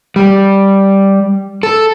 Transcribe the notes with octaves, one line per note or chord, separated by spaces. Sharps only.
G3
A4